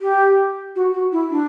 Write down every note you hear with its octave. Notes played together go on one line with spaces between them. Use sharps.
G4
F#4
F#4
E4
D4